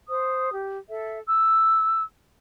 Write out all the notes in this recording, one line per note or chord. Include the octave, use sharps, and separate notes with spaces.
C5 D#6
G4
A4 E5
E6